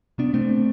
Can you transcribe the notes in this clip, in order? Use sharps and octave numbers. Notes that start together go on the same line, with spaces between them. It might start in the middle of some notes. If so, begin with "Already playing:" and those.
C3 B3 D4
C3 A3 C4